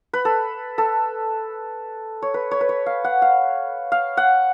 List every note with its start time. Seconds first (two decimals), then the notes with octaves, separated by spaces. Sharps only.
0.13 B4
0.25 A4
0.78 A4
2.22 C#5
2.34 B4
2.51 C#5
2.61 B4
2.69 C#5
2.86 F5
3.04 F#5
3.22 F5
3.92 F5
4.17 F#5